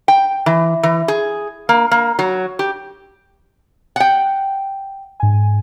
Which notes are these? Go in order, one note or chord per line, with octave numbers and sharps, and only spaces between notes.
G5
E3
E3
G#4
A#3
A#3
F#3
G4
F#5 G5
G#2 G#5